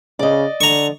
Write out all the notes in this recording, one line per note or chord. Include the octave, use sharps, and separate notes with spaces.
C#3 D5 D#5
D3 A#5 C#6